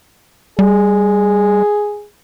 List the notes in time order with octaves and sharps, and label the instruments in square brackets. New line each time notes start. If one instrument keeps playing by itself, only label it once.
[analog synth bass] G3 [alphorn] G#4